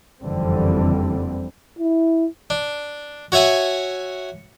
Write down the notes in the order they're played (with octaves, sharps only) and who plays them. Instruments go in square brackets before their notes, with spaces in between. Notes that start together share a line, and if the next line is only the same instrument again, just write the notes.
[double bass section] F#1 F2 D3 E3 G3 C4
[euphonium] E4
[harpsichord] D4
F#4 C#5 E5 F#5 G#5